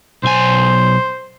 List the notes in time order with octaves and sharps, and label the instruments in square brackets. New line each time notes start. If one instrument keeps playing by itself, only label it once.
[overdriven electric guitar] B1 G#5 [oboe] C5